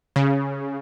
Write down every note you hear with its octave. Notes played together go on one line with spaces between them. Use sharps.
C#3